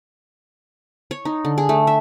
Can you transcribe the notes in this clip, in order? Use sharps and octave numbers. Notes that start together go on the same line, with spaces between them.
C#5
D#4
D3
G#4
A3
E5